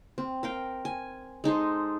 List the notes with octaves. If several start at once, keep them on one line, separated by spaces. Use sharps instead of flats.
C4
A#4 F5 G5
G#5
G#3 D#4 A4 C5